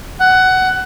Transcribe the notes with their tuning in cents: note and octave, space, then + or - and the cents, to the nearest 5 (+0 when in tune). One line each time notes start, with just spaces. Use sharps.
F#5 +15